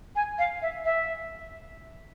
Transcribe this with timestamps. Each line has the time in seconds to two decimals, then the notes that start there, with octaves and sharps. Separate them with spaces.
0.16 G#5
0.38 F5
0.62 E5
0.85 E5